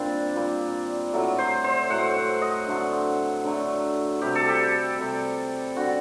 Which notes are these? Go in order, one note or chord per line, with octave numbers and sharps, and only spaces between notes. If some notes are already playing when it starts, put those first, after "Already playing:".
Already playing: A#2 G3 C4 D4
A#2 G3
A2 F#3 A3
C5
C5
A2 F#3 A3 F#5
F#5
D#5
D3 F#3 A3
D3 F#3 A3
C3 G3 G4
A4
G4
C3 G3
D3 G3 F#4